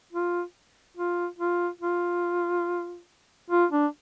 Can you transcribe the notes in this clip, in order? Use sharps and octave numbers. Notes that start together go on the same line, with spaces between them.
F4
F4
F4
F4
F4
D4